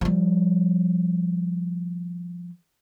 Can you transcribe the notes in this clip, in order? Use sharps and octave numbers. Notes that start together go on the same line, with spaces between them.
F3 G3